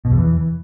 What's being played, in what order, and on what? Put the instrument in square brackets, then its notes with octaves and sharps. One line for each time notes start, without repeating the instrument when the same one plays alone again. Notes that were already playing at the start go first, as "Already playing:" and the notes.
[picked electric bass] B2
E2
E3